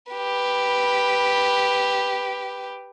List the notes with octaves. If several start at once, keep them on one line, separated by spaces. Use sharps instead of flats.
G4 B4